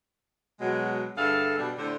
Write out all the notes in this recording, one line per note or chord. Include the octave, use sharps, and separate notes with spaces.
B2 F#3 G#3
G2 D3 G#4 A4 E5 F5
B2 G3 D4
A2 D3 C5